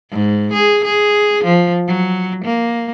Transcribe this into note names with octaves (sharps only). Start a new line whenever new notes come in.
G#2
G#4
G#4
F3
F#3
A#3